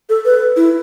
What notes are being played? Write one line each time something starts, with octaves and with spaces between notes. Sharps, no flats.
A4
B4
E4